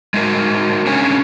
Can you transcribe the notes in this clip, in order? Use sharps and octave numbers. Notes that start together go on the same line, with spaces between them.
G#3 D#4 F#4 A#4
C#4 D4 G#4 C#5 G#5